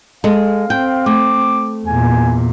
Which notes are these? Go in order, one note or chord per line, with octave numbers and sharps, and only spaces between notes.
G#3 A4 F5
C4 G5
A3 D6
E2 A#2 G#5